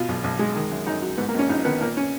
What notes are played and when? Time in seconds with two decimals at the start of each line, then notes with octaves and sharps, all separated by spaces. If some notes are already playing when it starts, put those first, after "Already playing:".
Already playing: B2 F4
0.08 B1
0.24 B1
0.39 G#3
0.55 D#3
0.71 F#2
0.86 F#2 D#4
1.02 F#3
1.17 G#2 B3
1.28 A#3
1.34 A#1 C#4
1.49 A#1 D#4
1.65 D#3 B3
1.81 A#2 A#3
1.97 C#4